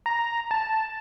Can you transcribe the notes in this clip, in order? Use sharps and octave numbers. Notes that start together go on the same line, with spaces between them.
A#5
A5